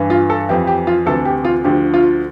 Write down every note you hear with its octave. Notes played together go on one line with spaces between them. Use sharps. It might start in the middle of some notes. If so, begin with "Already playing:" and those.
Already playing: G2 E3
F4
A4
F2 E3 G4
G4
F4
D2 C3 E3 A4
G4
F4
D2 D3 F3 G4
F4